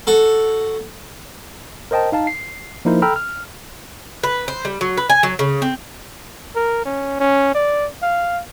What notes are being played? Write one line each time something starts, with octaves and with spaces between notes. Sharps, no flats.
F#4 A4
A#4 C5 D#5 G5 A5
D#4 F5 A5
C7
F3 A#3 D#4 E4 A#4 C5
A4 G5 A#5 B5 E6 F6
F6
B4
C5
G3
F#3
B4
G#5
F#3
C#3
C4
A#4
C#4
C#4
D5
F5